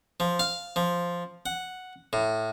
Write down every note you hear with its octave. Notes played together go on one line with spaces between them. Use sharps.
F3
F5
F3
F#5
A2